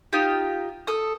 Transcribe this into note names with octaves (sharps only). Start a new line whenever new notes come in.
D#4 F4 G4
A4 D#6